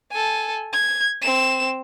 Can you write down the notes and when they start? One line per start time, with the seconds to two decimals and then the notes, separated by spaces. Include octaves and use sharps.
0.12 A4 G#5
0.73 G#6
1.22 C4 E7